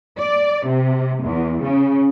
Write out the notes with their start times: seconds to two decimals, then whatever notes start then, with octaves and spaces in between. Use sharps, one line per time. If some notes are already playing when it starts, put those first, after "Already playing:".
0.19 D5
0.66 C3
1.24 E2
1.63 C#3